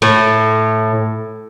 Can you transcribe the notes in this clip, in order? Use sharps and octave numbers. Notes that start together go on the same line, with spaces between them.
A2